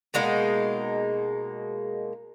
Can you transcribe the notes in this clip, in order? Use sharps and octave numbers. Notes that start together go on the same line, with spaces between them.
B2 G#3 A#3 D#4